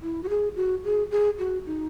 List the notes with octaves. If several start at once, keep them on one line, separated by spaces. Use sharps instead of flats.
E4
F#4
G#4
F#4
G#4
G#4
F#4
D#4